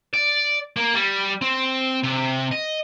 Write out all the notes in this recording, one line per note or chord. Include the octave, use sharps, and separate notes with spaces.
D5
A#3
G3
C4
C3
D#5